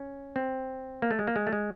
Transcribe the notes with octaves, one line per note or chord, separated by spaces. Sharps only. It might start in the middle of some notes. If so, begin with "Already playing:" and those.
Already playing: C#4
C4
A#3
A3
G#3
A#3
G#3
A3
G#3